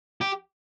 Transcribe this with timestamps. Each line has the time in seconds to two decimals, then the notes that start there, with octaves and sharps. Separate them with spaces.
0.21 G4